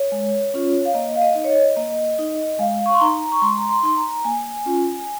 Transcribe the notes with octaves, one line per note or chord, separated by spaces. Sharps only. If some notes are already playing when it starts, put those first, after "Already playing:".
Already playing: C#5
G#3
C#4 F4
F5
A#3 D#5
F5
D#5
D#4
C#5
D#5
A#3 D#5
D#4
G#3 F5
C#6
C6
D#4 A#5
C#6
G#3 C6
A#5
C6
D#4 C6
A#5
A#3 G#5
C#4 F4